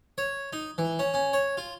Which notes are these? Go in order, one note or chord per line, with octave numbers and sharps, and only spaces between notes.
C#5
D#4
E3
C#4
C#4
C#5
F4